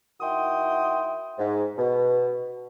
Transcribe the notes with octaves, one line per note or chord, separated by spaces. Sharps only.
D#3 E4 F#4 G5 C6 D#6
G#2
B2